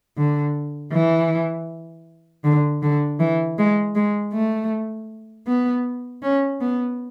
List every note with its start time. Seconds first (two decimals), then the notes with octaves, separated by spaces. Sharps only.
0.17 D3
0.93 E3
2.44 D3
2.82 D3
3.20 E3
3.58 G#3
3.95 G#3
4.33 A3
5.47 B3
6.23 C#4
6.61 B3